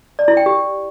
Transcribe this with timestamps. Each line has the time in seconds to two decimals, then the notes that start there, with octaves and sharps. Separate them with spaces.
0.19 D5
0.28 E4
0.37 G5
0.46 G4